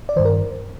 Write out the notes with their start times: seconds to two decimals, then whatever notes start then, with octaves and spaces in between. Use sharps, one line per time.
0.09 D5
0.16 D#3 C5
0.19 G2
0.25 A#4